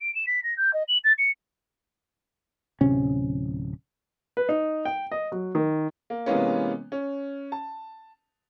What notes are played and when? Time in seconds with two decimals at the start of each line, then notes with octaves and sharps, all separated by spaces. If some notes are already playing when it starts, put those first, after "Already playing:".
0.01 D7
0.15 E7
0.27 B6
0.44 A#6
0.57 G6
0.74 D#5
0.88 F#7
1.04 A6
1.18 C#7
2.81 D1 C3 C#4
4.37 B4
4.49 D#4
4.85 G5
5.12 D#5
5.32 F#3
5.55 D#3
6.10 A#3
6.26 C3 E3 G#3 A#3 B3 C#4
6.92 C#4
7.52 A5